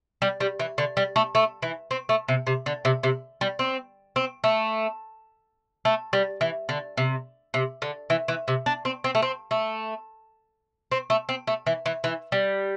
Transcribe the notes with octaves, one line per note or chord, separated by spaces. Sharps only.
G3
G3
E3
D3
G3
A3
A3
E3
C4
A3
C3
C3
D3
C3
C3
G3
C4
C4
A3
A3
G3
E3
D3
C3
C3
D3
E3
E3
C3
D4
C4
C4
A3
C4
A3
C4
A3
C4
A3
E3
E3
E3
G3